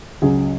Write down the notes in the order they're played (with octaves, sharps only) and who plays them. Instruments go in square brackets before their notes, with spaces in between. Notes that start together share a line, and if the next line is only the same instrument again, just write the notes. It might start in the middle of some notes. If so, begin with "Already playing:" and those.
[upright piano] C#2 C#3 F#3 C#4 G#4